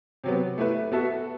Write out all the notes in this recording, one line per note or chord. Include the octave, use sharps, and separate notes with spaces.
C3 F#3 B3
A3 E4 B4
B3 F#4 A4 E5